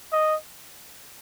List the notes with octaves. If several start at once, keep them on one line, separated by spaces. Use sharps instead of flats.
D#5